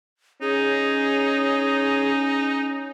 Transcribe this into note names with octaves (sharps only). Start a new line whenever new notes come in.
C#4 D#4 G#4